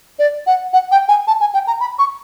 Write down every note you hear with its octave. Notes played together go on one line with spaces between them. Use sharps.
D5
F#5
F#5
G5
G#5
A5
G#5
G5
A#5
B5
C#6